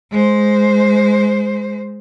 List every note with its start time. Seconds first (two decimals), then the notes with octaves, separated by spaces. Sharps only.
0.11 G#3 C5